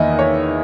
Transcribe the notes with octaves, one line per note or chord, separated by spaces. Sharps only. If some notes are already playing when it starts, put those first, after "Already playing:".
Already playing: E2 D#3 A#3 D#5 E5
C#5